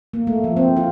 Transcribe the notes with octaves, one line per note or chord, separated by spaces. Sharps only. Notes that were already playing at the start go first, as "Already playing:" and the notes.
A#3
A3
F3
C4
F4